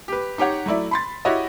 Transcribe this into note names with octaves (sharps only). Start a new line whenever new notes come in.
G4 B4
D#4 G4 C#5 F#5
F#3 A3 E4 D5
B5 C6 A6
E4 F#4 G4 C#5 D#5